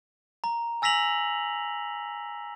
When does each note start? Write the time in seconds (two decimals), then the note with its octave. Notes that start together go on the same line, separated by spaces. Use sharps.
0.44 A#5
0.82 G#5 E6 A#6 B6 F7 F#7